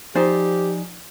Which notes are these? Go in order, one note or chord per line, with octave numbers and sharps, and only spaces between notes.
F3 D#4 G4 C5 D5 G#5